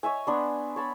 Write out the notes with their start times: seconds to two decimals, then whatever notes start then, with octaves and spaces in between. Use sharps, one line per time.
0.03 C#5 D#5 E5 G#5
0.27 B3 D4 C6
0.76 C#5 A5 B5